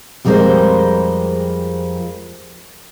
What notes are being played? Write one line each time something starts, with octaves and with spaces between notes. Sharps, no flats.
F2 G3 G#3 F4 A#4 C5